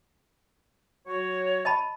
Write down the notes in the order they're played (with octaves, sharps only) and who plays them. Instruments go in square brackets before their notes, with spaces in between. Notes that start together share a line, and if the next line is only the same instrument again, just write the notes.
[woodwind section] F#3 F#4 C#5
[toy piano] D#5 A5 B5